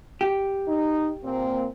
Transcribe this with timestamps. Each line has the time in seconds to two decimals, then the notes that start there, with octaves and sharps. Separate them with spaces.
0.21 G4
0.67 D#4
1.24 A#2 A#3 C4